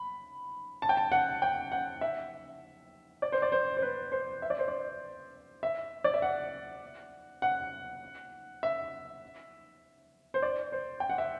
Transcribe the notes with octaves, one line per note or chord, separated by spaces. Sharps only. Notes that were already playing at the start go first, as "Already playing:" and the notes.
Already playing: B5
A5
G5
A5
F#5
G5
F#5
E5
D5
C5
D5
C5
C5
B4
C5
E5
D5
C5
D5
E5
D5
E5
F#5
F#5
E5
C5
D5
C5
G5
F#5
E5